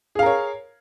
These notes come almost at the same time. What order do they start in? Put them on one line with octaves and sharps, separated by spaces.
G#4 F5 A#4 C#5